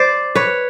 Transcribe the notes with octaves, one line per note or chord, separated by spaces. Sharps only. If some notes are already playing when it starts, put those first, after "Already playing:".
Already playing: C5 D5
B4 C#5